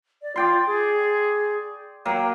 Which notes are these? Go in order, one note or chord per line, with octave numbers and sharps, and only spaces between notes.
D5
F4 D5 G5 C6
G#4
F#3 A#3 G5